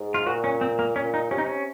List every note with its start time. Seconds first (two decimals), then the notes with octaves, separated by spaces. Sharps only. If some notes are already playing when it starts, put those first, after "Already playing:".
Already playing: G#2
0.14 F4
0.26 A#2 F#4
0.44 C#4
0.61 C4
0.79 A#3
0.96 A#2 C#4
1.14 D#4
1.31 C3 C#4
1.38 D#4
1.46 C#4